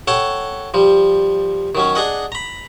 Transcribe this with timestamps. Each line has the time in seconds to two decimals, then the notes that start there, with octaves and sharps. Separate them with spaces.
0.08 A4 C#5 F#5 G5 A5
0.74 F3 G3
1.75 D#3 F#3 C#4
1.95 D4 G#4 D#5 F#5
2.32 A#5 B5